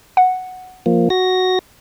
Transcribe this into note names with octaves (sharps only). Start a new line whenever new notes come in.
F#5
F3 A#3
F#4 A#6